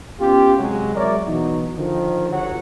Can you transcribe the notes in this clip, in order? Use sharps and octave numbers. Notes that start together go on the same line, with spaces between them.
B3 C#4 F4 G4
C3 F#3 G#3
F#3 G#3 A#4 C#5 D5 E5
B2 E3 F#3 D#4
D3 D#3 F3
G1 F#3 F#5